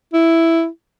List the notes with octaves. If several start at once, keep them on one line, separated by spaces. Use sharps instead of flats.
E4